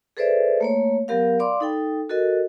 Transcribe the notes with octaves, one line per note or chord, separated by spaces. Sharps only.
G#4 A4 B4 C5 D5 E5
A3 A#3 C#5
F#3 B3 G4 A#4 F5
D5 F5 B5 C6 D6
D#4 A4 G5
F#4 A4 A#4 D#5